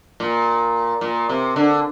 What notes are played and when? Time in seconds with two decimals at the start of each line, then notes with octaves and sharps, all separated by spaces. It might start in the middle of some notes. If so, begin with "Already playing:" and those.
0.20 A#2
1.01 A#2
1.29 C3
1.56 D3